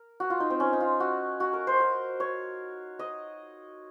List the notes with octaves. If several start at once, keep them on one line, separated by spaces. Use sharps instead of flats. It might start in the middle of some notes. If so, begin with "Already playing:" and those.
Already playing: A#4
F#4
F4
D#4
C4
C#4
D#4
F4
F#4
F#4
A#4
C5
A#4
C#5
D#5